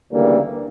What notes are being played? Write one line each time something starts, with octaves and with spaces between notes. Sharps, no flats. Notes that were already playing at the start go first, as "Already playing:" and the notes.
D2 C#3 E3 G3 A#3